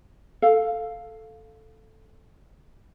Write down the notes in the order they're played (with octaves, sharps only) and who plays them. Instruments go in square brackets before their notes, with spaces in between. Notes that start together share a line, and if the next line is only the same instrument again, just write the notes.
[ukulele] A4 F5